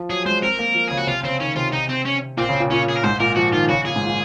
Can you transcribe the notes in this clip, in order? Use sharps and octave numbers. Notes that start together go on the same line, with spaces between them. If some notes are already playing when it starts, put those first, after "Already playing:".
Already playing: F3
F#3 G#4
G#3 C5
C4 A#4
A#3
F3
C#3 G#4
F#4
C3 F4
C#3 C4
D#3 C#4
C3 F4
D#4
C4
C#4
A#2 C4
C#3
A#2
A#2 C#4
G#4
A#4
G#2 C5
A#2 A#4
F3 F#4
D#3 F4
C#3 F#4
A#2 G#4
G#2
A#2